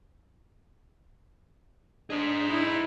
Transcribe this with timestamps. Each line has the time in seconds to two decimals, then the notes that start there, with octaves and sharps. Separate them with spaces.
2.10 D4 G#4 C5 D#5
2.45 D#4 E4